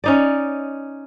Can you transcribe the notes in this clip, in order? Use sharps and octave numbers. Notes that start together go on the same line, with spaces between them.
C#4 D#4 D5